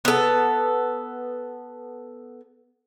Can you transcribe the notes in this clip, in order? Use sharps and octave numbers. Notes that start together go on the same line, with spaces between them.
B3 A4